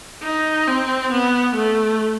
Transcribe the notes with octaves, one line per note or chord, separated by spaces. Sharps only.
D#4
C4
B3
A3